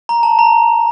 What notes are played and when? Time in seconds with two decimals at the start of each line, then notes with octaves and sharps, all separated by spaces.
0.09 A#5
0.23 A5
0.39 A#5